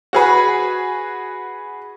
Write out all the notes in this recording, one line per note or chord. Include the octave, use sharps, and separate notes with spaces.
F#4 G#4 B4